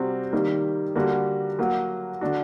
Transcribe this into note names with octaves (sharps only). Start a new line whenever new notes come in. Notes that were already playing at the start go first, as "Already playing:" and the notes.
Already playing: C3 G3 C4 F#4
D#3 G3 A#3
D3 G3 A#3 F#4
F#3 A#3 F#4
D3 A3 D4 F#4